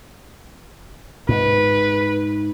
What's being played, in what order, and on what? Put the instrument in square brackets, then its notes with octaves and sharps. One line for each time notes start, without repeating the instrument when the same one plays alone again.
[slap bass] G#2 [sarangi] B4